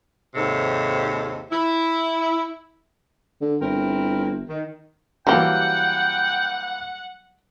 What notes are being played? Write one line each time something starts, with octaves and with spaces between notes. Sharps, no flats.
D#2 G#2 C3 A4 C#5
E4
D3
G1 C4 E4 A#4
D#3
E3 F#3 G3 A#3 G4 F#5 G5